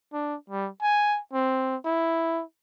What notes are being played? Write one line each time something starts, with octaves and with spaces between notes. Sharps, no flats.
D4
G3
G#5
C4
E4